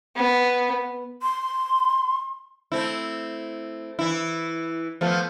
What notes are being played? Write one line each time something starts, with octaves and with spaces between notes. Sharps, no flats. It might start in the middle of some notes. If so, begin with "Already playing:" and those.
B3
C6
A3 C4 E4
E3 E4
F3 A3 B3